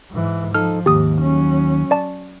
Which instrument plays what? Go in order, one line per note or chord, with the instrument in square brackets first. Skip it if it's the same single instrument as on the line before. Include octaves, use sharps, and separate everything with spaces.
[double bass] G#2 E3
[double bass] F3 [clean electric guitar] D#4 A4 [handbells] F6
[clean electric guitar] D#2 [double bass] G#2 [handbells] G4 D#6
[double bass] F#3 C#4
[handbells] D5 A5